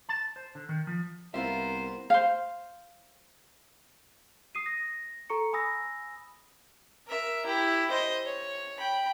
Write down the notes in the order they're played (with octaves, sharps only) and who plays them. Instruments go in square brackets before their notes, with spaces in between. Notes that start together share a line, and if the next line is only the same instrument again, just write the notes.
[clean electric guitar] A5
C5
D3
D#3
F3
[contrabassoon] C2 [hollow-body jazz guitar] B3 F4 E5 [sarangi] A#4 [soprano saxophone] C5
[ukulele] C5 F5
[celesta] D#6 C7 D#7
A#6
A4 A#5 C#6 C#7
G#5 B5 D#6 E6 A#6
[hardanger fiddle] A#4 E5
E4 G4
C5 D#5
C#5
G5 B5